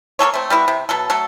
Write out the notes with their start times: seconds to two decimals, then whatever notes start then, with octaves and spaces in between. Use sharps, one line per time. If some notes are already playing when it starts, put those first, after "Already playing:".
0.19 A#3 G#4 A4 C#5
0.34 A3 C4
0.50 G3 B3 E4 F#4
0.68 C3
0.89 B2 F#3 A4
1.10 F#3 A3 A4